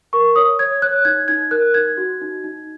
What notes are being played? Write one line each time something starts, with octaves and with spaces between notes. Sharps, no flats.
A#4 C#6
C#5 D#6
C#5 G#6
C#5 F#6
D#4 G#6
D#4 G#6
A#4 F#6
D#4 G#6
F#4
D#4
D#4